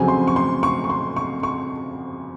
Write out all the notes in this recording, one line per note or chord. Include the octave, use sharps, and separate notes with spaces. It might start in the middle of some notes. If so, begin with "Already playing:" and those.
Already playing: F2 C#3 F#3 C4 G#5
C6
C#6
C6
C#6
C#6
C6
C#6
C#6